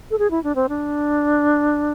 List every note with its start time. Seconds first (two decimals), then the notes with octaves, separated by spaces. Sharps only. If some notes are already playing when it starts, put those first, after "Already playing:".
0.11 A4
0.19 G#4
0.31 E4
0.44 D4
0.55 C4
0.69 D4